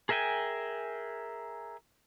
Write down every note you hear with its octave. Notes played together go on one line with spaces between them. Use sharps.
G#4 A#4 E5 G5 G#5